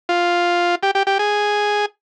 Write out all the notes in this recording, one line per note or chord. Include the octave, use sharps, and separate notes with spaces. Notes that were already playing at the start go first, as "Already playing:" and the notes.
F4
G4
G4
G4
G#4